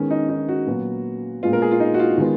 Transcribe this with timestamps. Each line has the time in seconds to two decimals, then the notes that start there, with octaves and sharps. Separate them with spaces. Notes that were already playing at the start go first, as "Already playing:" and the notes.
Already playing: D#3 G#3 B3 C#4
0.10 D#4
0.29 D#4
0.48 F#4
0.67 A#2 F#3 B3
1.43 A#2 G#3 B3 F4
1.53 A#4
1.62 G#4
1.71 F4
1.80 D#4
1.94 F#4
1.99 F4
2.18 D#3 G#3 B3